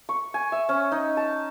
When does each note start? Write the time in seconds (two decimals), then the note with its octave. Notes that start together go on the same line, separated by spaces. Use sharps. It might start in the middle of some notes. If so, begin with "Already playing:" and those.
0.09 C#6
0.34 G#5
0.52 E5
0.69 C#4
0.92 D#4
1.17 A5